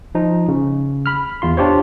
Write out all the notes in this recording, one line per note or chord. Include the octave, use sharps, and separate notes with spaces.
F3 D#4
C#3
B5 F6
E2 F4 C6
D4 F4 G4 C5 C#5